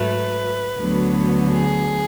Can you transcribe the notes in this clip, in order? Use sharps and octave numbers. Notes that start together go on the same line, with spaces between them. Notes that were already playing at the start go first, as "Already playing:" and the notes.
Already playing: G#2 F#3 A3 B4
D2 D3 F#3 B3
G#4